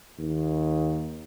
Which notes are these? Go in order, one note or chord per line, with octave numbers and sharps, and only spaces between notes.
D#2